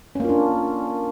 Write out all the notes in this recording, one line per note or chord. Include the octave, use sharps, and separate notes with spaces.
A#3 C#4 D4 F4